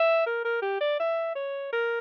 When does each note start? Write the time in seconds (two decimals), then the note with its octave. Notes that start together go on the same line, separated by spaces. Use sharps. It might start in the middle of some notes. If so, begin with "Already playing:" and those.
Already playing: E5
0.26 A#4
0.45 A#4
0.62 G4
0.81 D5
1.00 E5
1.35 C#5
1.72 A#4